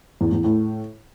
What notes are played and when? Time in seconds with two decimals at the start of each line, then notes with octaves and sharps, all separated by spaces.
0.21 E2
0.32 E2
0.44 A2